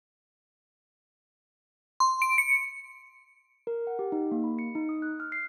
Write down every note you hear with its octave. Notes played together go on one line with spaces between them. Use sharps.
C6
D7
C#7
A#4
F#5
G4
D#4
A#3
B5
C#7
D#4
D#6
F#6
F6
C7